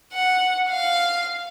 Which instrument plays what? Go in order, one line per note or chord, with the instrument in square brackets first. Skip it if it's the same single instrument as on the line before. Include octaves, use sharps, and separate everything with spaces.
[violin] F#5
F5